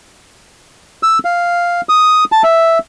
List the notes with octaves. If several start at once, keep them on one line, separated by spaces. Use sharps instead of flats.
E6
F5
D#6
A5
E5